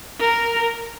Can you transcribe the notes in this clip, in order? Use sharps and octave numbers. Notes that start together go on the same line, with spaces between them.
A#4